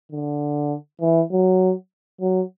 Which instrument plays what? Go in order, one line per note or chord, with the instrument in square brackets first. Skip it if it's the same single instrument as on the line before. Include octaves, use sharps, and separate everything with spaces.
[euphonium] D3
E3
F#3
F#3